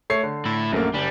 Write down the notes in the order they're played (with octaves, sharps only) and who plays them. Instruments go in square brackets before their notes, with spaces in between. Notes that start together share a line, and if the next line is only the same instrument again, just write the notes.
[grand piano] A3 C#5 C7
D3
[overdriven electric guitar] A2 E4
[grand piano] A#1 A3 A#3 [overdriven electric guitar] F#2
[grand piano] F#1 [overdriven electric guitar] G3